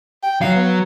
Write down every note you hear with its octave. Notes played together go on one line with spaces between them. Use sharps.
G5
F#3 F5
B3